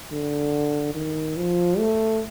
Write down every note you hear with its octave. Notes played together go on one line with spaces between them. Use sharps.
D3
D#3
F3
A3